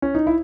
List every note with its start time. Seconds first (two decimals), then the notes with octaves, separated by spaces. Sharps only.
0.02 C#4
0.15 D#4
0.27 E4